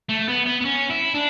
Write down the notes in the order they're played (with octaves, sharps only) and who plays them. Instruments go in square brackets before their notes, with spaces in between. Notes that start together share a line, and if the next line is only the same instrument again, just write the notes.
[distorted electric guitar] A3
B3
B3
B3
C#4
E4
D4